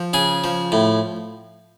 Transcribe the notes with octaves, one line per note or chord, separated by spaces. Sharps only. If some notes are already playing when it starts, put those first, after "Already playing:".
Already playing: F3
C#3 G#4
F3
A2